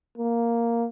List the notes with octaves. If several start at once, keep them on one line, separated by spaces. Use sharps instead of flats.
A#3